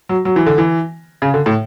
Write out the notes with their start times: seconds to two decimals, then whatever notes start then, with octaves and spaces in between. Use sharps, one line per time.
0.09 F#3
0.25 F#3
0.36 E3
0.46 D3
0.58 E3
1.22 C#3
1.34 D3
1.46 A2